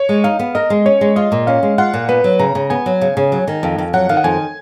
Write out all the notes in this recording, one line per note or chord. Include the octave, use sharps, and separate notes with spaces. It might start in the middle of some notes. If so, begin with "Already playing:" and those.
Already playing: C#5
G#3
D#4 F5
B3
A#4 D#5
G#3
C#4 C#5
G#3
F4 D#5
A#2
C#4 F5
G#3
F4 F#5
A#2
B3 B4
F#3
C#3 A#5
C#3
B3 G#5
F#3
C#3
C#3
F#3
D#3
F2
F2
F#3 F#5
D#3 F5
F#5
F2 G#5